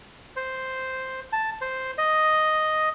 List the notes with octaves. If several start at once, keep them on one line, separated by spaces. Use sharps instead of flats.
C5
A5
C5
D#5